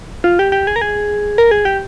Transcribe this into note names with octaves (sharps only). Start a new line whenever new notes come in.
F4
G4
G4
G#4
A#4
G#4
A#4
G#4
G4